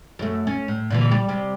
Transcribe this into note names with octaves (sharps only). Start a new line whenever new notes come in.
F#2 A3
C#4
A2
A#2 D3 E3
G3
C3 G3